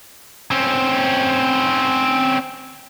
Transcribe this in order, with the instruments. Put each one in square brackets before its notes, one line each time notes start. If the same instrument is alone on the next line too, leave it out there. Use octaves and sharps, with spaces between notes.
[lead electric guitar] C4 C#4